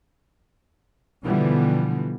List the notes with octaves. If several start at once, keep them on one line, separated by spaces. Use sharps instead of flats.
B2 D3 E3 F3 G3 B3